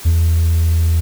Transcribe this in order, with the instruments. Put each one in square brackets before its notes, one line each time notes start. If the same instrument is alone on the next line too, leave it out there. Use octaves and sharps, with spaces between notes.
[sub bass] E2